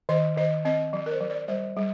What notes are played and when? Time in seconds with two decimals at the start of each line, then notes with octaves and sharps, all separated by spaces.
0.09 D#3 D#5
0.37 D#3 D#5
0.65 C4 D#5
0.93 F#3
1.06 A#4
1.11 C5
1.21 F#3
1.30 D5
1.48 G3 C5
1.76 G3